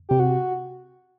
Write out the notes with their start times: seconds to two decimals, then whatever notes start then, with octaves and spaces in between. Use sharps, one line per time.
0.09 C3 G4
0.20 F#4